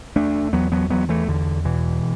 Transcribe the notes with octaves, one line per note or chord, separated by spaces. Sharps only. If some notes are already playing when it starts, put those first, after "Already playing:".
E2 A3 D4
E2 F#3 B3
F#3 B3
E2 F#3 B3
E3 A3
E2 D3
B2 E3